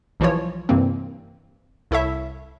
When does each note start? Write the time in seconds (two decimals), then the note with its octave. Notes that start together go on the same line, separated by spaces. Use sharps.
0.20 B1 E3 F3 G3 F4 C#5
0.69 G2 C3 E3 G3 A#3 C4
1.91 C2 E4 A4 C#5 E5